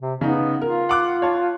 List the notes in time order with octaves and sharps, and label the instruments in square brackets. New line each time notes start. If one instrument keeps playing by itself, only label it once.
[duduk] C3
[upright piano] C#3 D#4 [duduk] B3
[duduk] F4 [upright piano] A#4
[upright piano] F#5 D6 F#6
C#5 A5